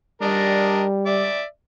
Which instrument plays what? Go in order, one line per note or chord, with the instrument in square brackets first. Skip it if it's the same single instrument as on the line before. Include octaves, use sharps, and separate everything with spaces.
[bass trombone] G3 [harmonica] D4 A#4 D#5
[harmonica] D5 E5